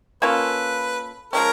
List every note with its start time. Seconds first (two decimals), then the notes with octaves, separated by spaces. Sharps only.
0.22 A#3 C#4 F4 A4 B4
1.33 F3 G#3 C#4 A#4